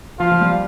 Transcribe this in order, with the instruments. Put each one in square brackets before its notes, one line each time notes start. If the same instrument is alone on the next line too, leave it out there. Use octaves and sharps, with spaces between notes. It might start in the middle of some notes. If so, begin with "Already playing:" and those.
[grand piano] F3 [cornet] F4
[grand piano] F3
G3